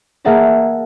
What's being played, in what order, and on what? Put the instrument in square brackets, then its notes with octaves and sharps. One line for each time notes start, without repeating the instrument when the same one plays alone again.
[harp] A#3 G#4 E5 F#5 A5 A#5